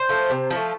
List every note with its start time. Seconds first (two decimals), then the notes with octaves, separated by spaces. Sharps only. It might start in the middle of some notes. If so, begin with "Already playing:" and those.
Already playing: C5
0.09 F3 A3
0.30 C3
0.51 F3 A3